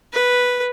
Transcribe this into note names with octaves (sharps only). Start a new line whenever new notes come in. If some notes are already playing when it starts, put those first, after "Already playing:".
B4